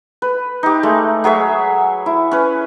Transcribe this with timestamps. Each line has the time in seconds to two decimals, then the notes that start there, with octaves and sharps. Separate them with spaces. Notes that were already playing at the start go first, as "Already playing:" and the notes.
0.22 B4
0.63 D#4 G4
0.83 G#3 A3
1.24 F#3 G#4 C#5 E5
2.06 E4
2.31 C#4 B4